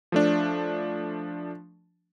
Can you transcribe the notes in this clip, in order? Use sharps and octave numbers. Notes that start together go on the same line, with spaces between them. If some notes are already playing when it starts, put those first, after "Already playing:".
F3 A3 D4